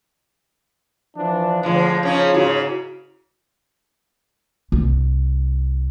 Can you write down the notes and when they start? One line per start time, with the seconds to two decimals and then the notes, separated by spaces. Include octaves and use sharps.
1.16 E3 F3 D4
1.63 A2 D3 F3 G#3
2.03 C#3 C#4 D#4
2.34 G#2 C#3 E4 F#4
4.72 C2